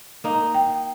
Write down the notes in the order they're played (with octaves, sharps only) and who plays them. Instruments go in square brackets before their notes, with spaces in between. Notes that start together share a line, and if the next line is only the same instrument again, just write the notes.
[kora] A#3 D#4
[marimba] G5